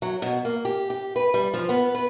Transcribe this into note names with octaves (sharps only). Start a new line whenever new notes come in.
F#3
B2
A#3
G4
G4
B4
G3
F3
B3
B4